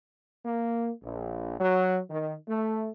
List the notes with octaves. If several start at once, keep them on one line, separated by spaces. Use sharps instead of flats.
A#3
A#1
F#3
D#3
A3